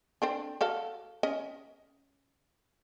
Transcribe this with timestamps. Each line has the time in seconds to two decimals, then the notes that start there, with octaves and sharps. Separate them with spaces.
0.22 C4 D4 A4
0.61 F#4 A4 F5
1.23 C#4 D#5